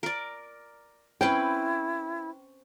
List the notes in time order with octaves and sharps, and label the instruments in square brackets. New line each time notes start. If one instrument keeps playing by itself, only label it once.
[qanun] A#4 D5
[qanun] C4 C#4 B4 [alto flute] E4 [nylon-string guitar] G5